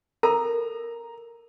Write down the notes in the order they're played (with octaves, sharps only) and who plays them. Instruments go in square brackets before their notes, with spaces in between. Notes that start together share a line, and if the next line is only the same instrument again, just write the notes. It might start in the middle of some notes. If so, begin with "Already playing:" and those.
[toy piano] A4 A#4 [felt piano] A#5